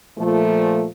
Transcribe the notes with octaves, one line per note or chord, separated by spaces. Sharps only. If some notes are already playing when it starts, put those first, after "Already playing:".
A#2 F3 A3